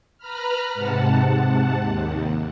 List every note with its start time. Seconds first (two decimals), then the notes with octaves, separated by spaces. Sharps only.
0.18 B4 A#5 B5 F6
0.74 G#2 C3 F#5 A5
1.79 D#2